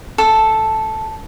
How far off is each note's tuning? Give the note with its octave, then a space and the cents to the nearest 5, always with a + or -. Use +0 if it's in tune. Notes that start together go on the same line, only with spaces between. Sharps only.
A4 -5